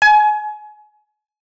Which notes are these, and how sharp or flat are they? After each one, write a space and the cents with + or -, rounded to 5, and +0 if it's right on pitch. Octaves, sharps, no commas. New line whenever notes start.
G#5 +30